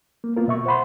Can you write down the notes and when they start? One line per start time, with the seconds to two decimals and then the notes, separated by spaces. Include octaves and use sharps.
0.24 A#3
0.36 A#3 B3 F4 A#4
0.48 B2 E5 C#6
0.66 C5 F#5 B5 C6